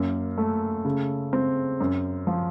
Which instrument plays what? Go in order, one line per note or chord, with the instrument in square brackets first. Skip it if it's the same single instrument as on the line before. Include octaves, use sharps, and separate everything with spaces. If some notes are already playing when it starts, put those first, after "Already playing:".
Already playing: [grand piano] F#2 A#3
A3
C#3
C4
F#2
F3